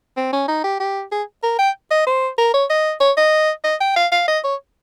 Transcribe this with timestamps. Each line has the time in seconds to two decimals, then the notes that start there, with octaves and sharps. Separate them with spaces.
0.17 C4
0.32 C#4
0.48 D#4
0.64 G4
0.80 G4
1.12 G#4
1.43 A#4
1.59 G5
1.91 D#5
2.07 C5
2.38 A#4
2.54 C#5
2.70 D#5
3.01 C#5
3.17 D#5
3.64 D#5
3.81 G5
3.96 F5
4.12 F5
4.28 D#5
4.44 C#5